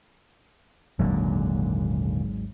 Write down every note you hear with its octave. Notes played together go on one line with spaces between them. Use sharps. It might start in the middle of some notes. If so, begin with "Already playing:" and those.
G#1 D#2 A#2 D3 F#3 G#3